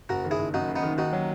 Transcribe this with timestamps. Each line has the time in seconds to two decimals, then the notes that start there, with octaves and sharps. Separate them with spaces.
0.09 F#1 F#4 A#4
0.25 D#3
0.31 E4 G#4
0.38 F#1
0.54 F#2 D#4 F#4
0.68 F#1
0.76 B3 D#4
0.83 D#3
0.98 D#2 D#4 F#4
1.13 F#3